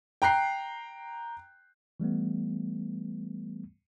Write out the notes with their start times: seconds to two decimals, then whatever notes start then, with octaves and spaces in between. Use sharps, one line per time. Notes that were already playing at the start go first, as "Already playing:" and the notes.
0.22 G5 A#5 F#6 C7
2.00 E3 G3 A3 B3